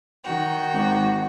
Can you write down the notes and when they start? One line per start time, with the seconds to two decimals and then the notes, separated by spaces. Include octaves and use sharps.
0.24 D#3 F#4 G5
0.73 G#1